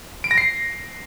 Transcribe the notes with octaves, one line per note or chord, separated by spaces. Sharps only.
D7
A#6
C7